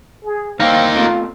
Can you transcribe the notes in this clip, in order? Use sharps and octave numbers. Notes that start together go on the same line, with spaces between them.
G#4
C2 A#3 C4 D#4 F5
B2 A3 C4 F4